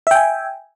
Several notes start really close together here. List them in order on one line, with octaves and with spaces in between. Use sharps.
E5 G5 G#5